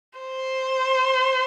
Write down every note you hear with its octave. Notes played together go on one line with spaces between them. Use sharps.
C5